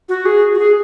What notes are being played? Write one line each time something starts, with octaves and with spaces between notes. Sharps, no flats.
F#4
G#4
F#4
G#4